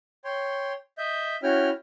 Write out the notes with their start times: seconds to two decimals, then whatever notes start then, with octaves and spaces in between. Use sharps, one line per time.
0.24 C#5 G5 C6
0.98 D#5 E5 G6
1.43 C#4 E4 F#4 C#5 G5 F6